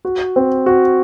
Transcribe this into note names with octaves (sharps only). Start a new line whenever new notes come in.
F#4
C4
F#4